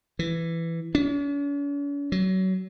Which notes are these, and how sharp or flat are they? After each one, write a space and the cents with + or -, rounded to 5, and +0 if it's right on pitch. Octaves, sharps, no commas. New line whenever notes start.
E3 +10
C#4 +45
F#3 +25